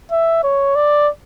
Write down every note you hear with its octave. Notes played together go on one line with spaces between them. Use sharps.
E5
C#5
D5